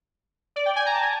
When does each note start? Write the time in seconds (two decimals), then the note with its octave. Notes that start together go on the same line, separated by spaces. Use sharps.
0.56 D5
0.66 G5
0.76 G#5
0.86 A#5
0.94 A5
1.03 G#5